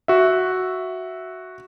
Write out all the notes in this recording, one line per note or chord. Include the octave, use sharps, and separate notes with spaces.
F#4 E5